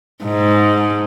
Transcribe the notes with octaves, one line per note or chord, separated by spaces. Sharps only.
G#2